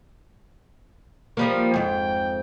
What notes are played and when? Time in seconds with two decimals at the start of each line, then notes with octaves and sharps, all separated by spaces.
1.37 F3 G3 A#3
1.74 F2 G#2 G5